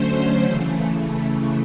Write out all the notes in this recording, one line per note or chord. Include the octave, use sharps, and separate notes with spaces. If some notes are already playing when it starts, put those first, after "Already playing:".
Already playing: D3 F#3 A3 C#4 C5
C#3 E3 A3